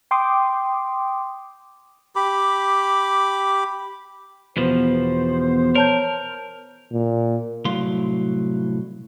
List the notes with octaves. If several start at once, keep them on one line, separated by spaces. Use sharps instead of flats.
G5 C6 D6 D#6
G4 B5 D6
E2 B2 F3 B3 C5
A#4 C#5 A5 G6
A#2
C2 A2 F#3 F5 C6